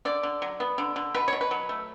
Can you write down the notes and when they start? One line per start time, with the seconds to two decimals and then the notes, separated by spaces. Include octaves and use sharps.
0.05 D3 D5
0.23 D3
0.42 F#3
0.60 B3
0.78 D3
0.96 D3
1.14 B2 B4
1.28 B2 C#5
1.41 B4
1.51 F#3
1.69 A3